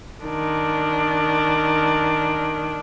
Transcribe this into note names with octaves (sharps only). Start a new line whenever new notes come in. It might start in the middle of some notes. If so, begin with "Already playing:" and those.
D#3 D4